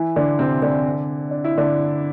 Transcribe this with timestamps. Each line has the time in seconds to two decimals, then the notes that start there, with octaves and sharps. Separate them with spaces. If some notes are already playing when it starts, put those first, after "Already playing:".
Already playing: E3 E4
0.16 D3 D4
0.39 C3 C4
0.62 D3 D4
1.31 D4
1.44 E4
1.58 D3 D4